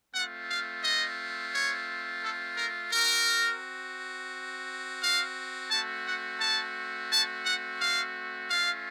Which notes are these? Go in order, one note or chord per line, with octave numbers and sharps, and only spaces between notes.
A3 C4 F4 F#5
F5
D#5
C#5
A4
A#4
C4 F#4 A#4
F5
A3 C4 F#4 A5
F#5
A5
A5
F#5
F5
A3 C#4 F4 F5